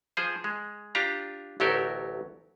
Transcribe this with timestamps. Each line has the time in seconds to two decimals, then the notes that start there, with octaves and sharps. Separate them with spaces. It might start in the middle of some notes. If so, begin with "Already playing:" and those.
0.17 F3 G#4 C5
0.44 G#3
0.95 D4 F4 G4 A#5
1.60 A1 D2 F#3 G4 A4 A#4